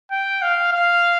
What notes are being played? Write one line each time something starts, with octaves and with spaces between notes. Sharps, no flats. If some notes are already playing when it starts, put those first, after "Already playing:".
G5
F5
F5